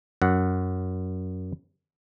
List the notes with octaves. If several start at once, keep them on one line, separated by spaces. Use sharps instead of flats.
F#2 F#5